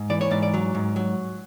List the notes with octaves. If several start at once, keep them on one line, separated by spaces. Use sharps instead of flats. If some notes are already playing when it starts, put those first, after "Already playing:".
Already playing: G#2
E3 D5
C#5
G#2 D5
D5
F#3
G#2
F#3